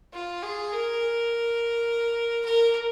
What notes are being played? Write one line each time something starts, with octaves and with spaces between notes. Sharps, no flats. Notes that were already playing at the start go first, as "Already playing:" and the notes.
F4
G#4
A#4
A#4